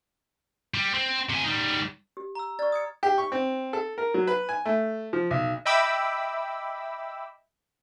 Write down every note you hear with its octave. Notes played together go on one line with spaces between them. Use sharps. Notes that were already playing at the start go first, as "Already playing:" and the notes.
G3
C4
C3 G#5
G3 D#4
G4
A#5 E6
D5 C#6 F6 A6
D#6 G#6 C#7
G4
C#6
C4
A4
A#4
F#3
B4
G#5
A3
F3
B1
D#5 E5 G5 B5 D6 E6